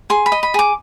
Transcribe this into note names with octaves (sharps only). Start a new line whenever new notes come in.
G#4 C6
B5
D#5
B5
G#4 D6